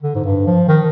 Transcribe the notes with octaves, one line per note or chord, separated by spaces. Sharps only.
D3
G#2
G2
F3
D#3